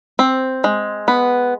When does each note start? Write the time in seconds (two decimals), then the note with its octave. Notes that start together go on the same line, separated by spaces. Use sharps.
0.19 C4
0.64 G#3
1.08 B3